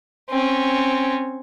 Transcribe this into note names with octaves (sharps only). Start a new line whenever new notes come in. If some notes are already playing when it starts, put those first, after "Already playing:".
C4 C#4